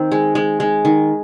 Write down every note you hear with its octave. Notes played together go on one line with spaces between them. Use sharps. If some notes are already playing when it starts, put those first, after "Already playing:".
Already playing: D#3 C4
G#3
G#3
G#3
D#3